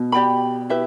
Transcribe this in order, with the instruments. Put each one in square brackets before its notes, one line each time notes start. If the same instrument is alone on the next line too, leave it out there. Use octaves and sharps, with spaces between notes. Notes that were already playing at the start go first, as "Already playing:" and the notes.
Already playing: [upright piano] B2
[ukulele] G4 D5 G5 B5
E4 G4 B4 E5